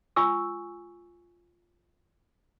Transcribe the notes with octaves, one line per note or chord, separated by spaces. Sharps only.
F4 G#5 C#6 E6